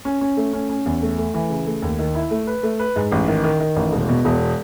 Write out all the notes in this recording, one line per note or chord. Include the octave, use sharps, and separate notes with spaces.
C#4
C#4
A3
C#4
C#4
E2
A3
A3
E3
C#3
A3
D#2
D#3
E4
A3
B4
A3
B4
G#2
A1
D#3
D#3
D#3
A1
E1
B2
E1